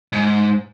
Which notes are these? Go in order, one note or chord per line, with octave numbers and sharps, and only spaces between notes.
G#2